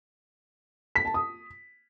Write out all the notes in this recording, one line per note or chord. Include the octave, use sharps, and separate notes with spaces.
B6
A5
D#6